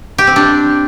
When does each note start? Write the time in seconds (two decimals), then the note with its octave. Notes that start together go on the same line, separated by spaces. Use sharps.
0.18 G4
0.27 C4
0.36 D4